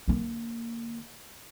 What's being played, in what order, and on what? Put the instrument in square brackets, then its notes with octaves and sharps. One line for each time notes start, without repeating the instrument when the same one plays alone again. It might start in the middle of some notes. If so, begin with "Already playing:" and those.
[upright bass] D3 A#3